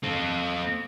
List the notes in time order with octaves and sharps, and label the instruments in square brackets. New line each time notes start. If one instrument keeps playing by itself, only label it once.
[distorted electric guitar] C4 A4